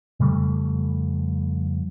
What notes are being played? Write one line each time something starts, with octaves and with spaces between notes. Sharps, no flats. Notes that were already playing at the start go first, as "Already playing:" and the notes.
F2 C#3 G3 A3